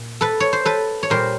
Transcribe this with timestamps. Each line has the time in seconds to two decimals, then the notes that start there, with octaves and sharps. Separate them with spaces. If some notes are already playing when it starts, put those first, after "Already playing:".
Already playing: A#2
0.21 A4 B4
0.40 C#5
0.53 C5
0.65 A4 B4
1.03 C#5
1.10 A#2 G3 A#4 C5